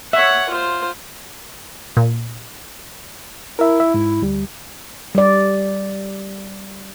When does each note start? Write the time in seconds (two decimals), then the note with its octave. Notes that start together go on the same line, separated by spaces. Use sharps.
0.13 C#5 E5 F#5
0.50 F4 C5
1.97 A#2
3.59 E4 A#4 E5
3.80 E5
3.94 G#2
4.22 D2 G3
5.15 G3 D5